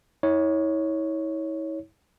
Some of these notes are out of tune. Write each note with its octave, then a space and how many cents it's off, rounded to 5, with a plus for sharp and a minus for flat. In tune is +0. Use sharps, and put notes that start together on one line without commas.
E4 -40 C#5 +0